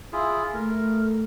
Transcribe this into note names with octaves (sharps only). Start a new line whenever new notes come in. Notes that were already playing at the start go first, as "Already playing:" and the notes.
E4 F4 G#4
A3 A#4